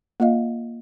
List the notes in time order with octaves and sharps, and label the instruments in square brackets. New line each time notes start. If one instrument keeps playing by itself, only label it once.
[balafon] A#3 F4 D#5 F5